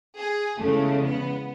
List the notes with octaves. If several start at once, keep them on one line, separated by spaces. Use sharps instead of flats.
G#4
E2 C#3 E3 G#3 A3
B3